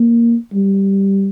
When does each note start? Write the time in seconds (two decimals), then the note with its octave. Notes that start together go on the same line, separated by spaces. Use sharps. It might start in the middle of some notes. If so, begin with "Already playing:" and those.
Already playing: A#3
0.54 G3